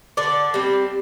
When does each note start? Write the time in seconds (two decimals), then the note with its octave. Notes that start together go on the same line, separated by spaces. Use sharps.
0.17 D3 D5
0.54 G3 C4